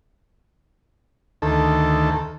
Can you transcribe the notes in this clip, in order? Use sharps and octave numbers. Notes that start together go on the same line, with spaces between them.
D2 D#3 A4